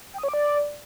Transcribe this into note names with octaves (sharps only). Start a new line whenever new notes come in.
G5
D#6
C#5
D6
D5